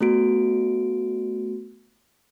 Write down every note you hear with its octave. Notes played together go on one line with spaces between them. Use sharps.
A3 B3 F#4 D7